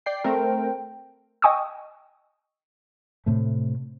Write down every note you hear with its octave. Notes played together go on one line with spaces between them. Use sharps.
D5 G5 C7
A3 C4 A#4 G5
D#5 G5 G#5 C#6 D#6 E6
A2 C3 A3